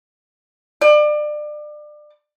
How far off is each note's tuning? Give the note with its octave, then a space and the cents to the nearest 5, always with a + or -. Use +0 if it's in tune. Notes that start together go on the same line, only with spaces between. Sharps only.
D5 +30